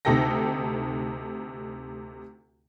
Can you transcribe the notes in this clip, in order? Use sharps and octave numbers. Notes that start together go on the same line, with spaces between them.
D2 C3 D#4 A4 G5 A#6